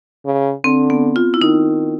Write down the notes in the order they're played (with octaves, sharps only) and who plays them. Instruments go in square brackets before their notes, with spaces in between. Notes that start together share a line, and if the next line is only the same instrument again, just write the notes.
[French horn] C#3
[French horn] D3 [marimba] C4
[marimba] B3
F4
E4
[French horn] D#3 [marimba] D#4